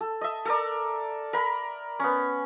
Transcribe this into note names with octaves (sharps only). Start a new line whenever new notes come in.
A4
D#5 E5
A4 A#4 D5
A#4 B5
B3 C#4